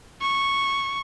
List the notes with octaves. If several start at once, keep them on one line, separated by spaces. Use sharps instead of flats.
C#6